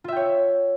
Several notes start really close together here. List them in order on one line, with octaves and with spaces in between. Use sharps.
F4 E5 G5 C#5